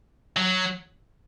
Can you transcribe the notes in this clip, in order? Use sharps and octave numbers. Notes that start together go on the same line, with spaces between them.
F#3